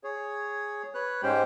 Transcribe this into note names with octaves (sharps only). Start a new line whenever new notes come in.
G#4 C#5
B4 C#5 F#6
G#2 G#3 C#4 G4 C5 G5